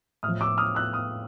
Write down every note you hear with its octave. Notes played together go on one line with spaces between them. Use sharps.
A2 D#6 F6
F3
D6 E6
D#6 F6
E6 F#6
D#6 F6